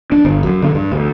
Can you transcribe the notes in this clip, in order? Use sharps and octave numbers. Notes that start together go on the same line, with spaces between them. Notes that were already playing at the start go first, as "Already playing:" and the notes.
D4
G1
F#2
D3
G2
D2